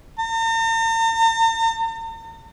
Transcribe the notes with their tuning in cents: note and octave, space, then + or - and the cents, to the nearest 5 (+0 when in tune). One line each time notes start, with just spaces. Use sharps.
A#5 -45